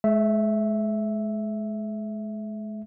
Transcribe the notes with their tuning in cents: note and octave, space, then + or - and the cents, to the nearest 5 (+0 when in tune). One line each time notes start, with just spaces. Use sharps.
G#3 +40 E5 +0